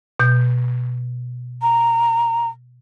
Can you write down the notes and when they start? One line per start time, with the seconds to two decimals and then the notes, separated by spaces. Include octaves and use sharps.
0.20 B2 G6
1.62 A#5